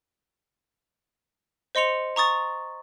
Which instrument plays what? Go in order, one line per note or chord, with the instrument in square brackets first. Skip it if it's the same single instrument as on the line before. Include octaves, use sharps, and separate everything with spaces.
[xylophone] C5 D#5 C6 C#7 F7
A#5 C#6 D#6 A6